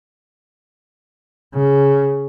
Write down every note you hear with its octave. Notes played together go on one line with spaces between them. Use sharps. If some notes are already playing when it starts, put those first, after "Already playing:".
C#3